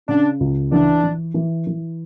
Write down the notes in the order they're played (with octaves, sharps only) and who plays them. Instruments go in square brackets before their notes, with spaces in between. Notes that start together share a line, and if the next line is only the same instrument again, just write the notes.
[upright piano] C#3 [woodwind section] D4
[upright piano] C#2
[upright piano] E3 [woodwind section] D4
[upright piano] E3
E3
E3